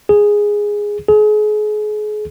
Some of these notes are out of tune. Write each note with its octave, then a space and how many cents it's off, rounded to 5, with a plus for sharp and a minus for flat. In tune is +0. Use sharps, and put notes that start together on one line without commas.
G#4 -5
G#4 +35